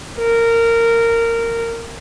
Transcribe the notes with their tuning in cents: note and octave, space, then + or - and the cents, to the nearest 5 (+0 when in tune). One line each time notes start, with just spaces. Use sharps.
A#4 -15